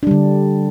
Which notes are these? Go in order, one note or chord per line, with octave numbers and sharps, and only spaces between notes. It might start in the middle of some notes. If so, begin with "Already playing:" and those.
D3 G3 D4